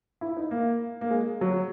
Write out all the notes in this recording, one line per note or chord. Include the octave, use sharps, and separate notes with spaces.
E4
D#4
A#3
A#3
G#3
F#3